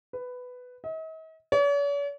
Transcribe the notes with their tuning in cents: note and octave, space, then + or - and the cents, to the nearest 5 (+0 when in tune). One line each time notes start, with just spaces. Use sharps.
B4 +10
D#5 +45
C#5 +45